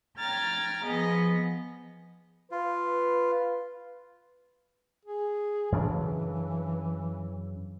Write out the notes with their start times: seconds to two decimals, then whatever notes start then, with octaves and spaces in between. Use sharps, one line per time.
0.18 G5 A#5 F6 G#6 A6
0.83 F3 B3 G#4 D#5
2.51 F4 B4
5.05 G#4
5.72 F#2 C#3 E3 D4